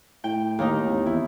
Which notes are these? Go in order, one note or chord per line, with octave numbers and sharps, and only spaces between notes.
A2 G5
D#2 D#4
G#1
E2 E4